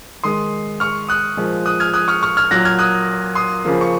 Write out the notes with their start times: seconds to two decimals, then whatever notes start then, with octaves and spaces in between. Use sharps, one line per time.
0.24 D#3 G#3 C6 D#6
0.80 C#6 F6
1.09 D#6 F#6
1.37 A#2 F3 G#3
1.66 D#6 F#6
1.80 F6 G#6
1.94 D#6 F#6
2.08 C#6 F6
2.23 C#6 F6
2.37 F6 G#6
2.51 A#2 F#3 A#3 F#6 A#6
2.65 F6 G#6
2.79 D#6 F#6
3.35 C6 D#6
3.65 C#3 F3 A#3
3.81 C#6